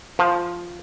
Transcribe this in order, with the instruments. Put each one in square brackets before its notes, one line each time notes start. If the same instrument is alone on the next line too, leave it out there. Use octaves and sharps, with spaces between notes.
[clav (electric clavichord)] F3